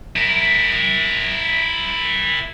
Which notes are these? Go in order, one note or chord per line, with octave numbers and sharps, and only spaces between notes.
E4 A#4